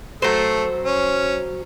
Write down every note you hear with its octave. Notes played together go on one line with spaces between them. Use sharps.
F#3 A3 C5
C#4